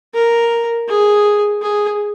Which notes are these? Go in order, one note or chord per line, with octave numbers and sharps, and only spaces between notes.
A#4
G#4
G#4